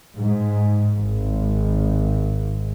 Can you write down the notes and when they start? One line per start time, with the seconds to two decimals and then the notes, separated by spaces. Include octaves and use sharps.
0.16 G#2
0.98 G#1